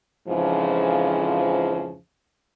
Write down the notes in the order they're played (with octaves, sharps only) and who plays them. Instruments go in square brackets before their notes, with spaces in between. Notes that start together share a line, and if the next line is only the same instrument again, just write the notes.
[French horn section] F2 G#2 C#3 E3 F3